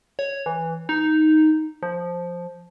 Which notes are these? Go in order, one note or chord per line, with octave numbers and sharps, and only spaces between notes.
C#5
E3
D#4
F3